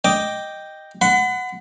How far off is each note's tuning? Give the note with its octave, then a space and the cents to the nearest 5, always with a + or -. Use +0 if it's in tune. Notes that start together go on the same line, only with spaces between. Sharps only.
D#5 +0 G5 +0 D6 +0
F#5 +0 B5 +40